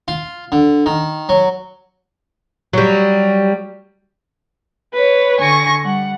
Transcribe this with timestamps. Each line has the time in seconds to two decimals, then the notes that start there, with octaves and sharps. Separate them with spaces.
0.08 F4
0.52 D3
0.86 D#3
1.29 F#3
2.73 F#3 G3
4.93 B4 C#5
5.39 D3 G#5 C#6 A#6
5.83 G3 F#5